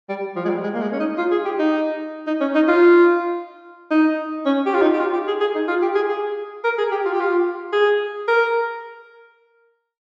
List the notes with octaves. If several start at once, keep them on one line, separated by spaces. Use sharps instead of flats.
G3
F3
G#3
G3
G#3
A#3
G#3
C#4
D#4
F4
G#4
G4
D#4
D#4
C#4
D#4
F4
D#4
C#4
G4
F4
D#4
G4
F4
G4
G#4
G#4
D#4
F4
G4
G#4
G#4
A#4
G#4
G4
F4
G4
F4
G#4
A#4